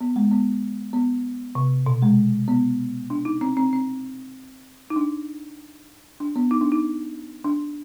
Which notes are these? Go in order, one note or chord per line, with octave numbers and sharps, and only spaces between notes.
B3
G#3
B3
B3
C3
B2
G#3
B3
D4
D#4
C4
C4
C4
D#4
D4
D4
B3
D#4
D4
D#4
D4